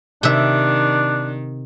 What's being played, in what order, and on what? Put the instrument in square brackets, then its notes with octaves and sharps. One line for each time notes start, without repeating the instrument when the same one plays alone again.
[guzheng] C3 E5 [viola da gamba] D#3 [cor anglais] D4